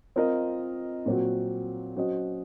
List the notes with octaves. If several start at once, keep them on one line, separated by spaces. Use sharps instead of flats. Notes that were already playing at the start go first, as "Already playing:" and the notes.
C4 F4 A#4 D#5
A#2 F#3 C4 F#4
F#3 C#4 F#4 C5 D#5